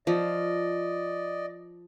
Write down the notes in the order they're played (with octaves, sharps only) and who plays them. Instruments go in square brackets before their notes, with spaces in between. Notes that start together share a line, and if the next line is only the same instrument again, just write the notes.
[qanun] F3 [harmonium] D5 D#5